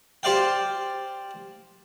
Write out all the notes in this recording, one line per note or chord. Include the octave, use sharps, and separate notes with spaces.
G4 C5 D5 F5 G5